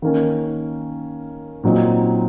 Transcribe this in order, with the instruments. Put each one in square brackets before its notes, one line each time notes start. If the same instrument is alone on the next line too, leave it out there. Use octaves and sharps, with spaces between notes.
[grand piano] D#3 A#3 C#4
A#2 F#3 C4 D#4